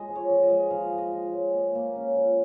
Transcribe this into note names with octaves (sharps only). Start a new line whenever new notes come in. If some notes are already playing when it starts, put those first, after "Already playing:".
Already playing: G#3 D#5
F3
C#5
F3
D#5
G#3
F3 F5
F3
D#5
F3
C#5
G#3
A#3
A#3
C#4
F3